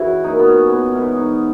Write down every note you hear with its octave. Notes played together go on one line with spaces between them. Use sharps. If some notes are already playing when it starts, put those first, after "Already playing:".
Already playing: F#2 C#3 E3 E4 F#4 G#4
A#2 F#3 D#4
B3
C#4
B3
G#2 E3 C#4
D#4